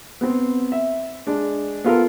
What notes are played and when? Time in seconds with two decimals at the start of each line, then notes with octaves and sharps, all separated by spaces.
0.21 B3 C4
0.72 E5
1.27 G#3 D4
1.84 B3 F4 A4 A#4